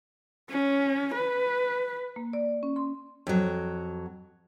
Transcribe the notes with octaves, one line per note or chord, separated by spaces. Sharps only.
C#4
B4
A#3
D5
C#4
C6
F2 F#3